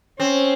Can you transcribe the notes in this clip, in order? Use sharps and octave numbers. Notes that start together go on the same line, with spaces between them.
C4 C#4